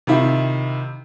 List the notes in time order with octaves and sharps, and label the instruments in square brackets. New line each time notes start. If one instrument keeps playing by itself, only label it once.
[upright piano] C3 D#3 E4 F4